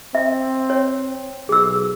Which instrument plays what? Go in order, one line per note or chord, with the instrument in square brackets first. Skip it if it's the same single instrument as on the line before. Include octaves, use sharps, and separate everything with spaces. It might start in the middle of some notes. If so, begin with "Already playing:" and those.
[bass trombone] C4 [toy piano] E5
[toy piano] C#5
[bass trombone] B1 [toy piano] G#4 E6